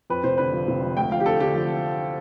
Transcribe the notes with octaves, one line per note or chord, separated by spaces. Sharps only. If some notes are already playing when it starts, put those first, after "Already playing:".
F2 B4
F1 C5
D3 B4
F3
F1
F3
D2 G5
F3 F5
G4
D3 A4
D3 G4
F3